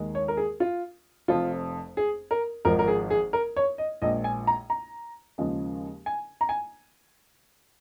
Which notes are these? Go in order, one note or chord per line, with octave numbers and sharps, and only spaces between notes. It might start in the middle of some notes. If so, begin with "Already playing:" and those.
Already playing: D#2 D#3 G#3
C#5
A#4
G#4
F4
F1 F2 F3 F4
G#4
A#4
G#1 G#2 F3 G#3 A#4
A#4
G#4
G#4
A#4
C#5
D#5
A#1 A#2 G#3 D#5
G#5
A#5
A#5
D#2 C#3 F3 G#3
G#5
A#5
G#5